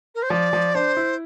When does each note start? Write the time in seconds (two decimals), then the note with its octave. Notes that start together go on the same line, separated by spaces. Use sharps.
0.15 A#4
0.22 C5
0.30 F3 D5
0.53 F3
0.75 D4 C5
0.97 E4